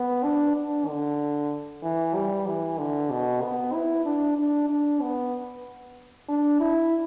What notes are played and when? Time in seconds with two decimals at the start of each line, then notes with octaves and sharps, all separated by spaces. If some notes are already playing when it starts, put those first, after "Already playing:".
Already playing: B3
0.24 D4
0.56 D4
0.88 D3
1.83 E3
2.15 G3
2.47 E3
2.78 D3
3.10 B2
3.42 B3
3.74 E4
4.05 D4
4.38 D4
4.70 D4
5.01 B3
6.29 D4
6.61 E4